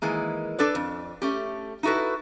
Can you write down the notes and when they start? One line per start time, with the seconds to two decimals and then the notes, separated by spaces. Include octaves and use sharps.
0.02 D#3 E3 G#3 A#3
0.58 D4 A4 B4 D5
0.75 F2
1.22 A3 C#4 G4
1.83 D#4 E4 F#4 A4 B4